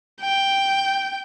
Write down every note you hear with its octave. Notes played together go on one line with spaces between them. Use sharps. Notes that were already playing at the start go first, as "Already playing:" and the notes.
G5